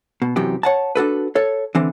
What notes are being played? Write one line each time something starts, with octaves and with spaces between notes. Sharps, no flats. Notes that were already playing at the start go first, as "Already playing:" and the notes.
B2
F#2 C3 E3 G4
C#5 F#5 A5
D4 F#4 A4 B4
A4 C#5
D3 E3 C4